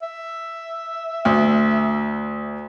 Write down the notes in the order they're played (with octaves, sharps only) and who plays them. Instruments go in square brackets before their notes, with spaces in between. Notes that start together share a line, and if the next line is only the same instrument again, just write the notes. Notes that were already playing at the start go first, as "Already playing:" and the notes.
[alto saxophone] E5
[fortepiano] D2